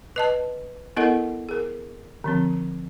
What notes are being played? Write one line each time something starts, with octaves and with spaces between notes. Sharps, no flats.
B4 D#5 A5
B3 E4 A4 A#4 D#5 F#5
G#4 A#4
D3 F3 C4